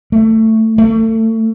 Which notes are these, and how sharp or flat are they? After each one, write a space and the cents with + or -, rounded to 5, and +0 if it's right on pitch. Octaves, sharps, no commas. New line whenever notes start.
A3 +15
A3 +30